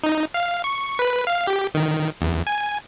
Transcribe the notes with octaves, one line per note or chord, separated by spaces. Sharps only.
D#4
F5
C#6
B4
F5
G4
D#3
E2
G#5